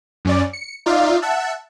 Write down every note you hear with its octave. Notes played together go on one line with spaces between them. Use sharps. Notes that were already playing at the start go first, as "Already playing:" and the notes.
F#2 C#4 D5
C#7
D#4 F4 D5 E5 F5
E5 F#5 A5